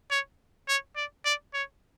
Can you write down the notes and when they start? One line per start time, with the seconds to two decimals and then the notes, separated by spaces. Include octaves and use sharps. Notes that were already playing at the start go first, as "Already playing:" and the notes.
0.11 C#5
0.68 C#5
0.96 D5
1.25 D5
1.54 C#5